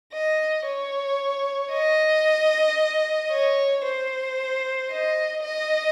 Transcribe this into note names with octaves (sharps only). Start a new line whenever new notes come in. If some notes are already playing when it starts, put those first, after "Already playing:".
D#5
C#5
D#5
C#5
C5
D#5
D#5